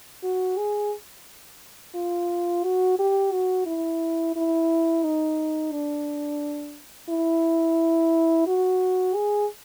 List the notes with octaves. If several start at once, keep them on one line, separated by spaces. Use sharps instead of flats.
F#4
G#4
F4
F#4
G4
F#4
E4
E4
D#4
D4
E4
F#4
G#4